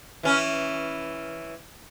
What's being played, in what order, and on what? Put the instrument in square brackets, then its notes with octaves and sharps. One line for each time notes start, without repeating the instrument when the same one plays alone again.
[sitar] E3 C#4